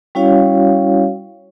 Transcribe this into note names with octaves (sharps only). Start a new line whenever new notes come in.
G3 C#4 E4 F#4 C#5 F5